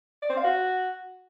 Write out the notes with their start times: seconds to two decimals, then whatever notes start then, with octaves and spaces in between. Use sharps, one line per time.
0.22 D5
0.30 C4
0.37 F5
0.44 F#4